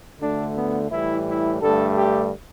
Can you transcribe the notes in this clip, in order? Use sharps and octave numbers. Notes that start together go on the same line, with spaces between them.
D2 D3 A3 D4
B3
A2 E3 G3 E4
E4
G2 D3 A3 A4
G4